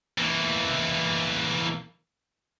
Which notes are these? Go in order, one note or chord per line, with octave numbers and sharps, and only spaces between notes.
E3 A#3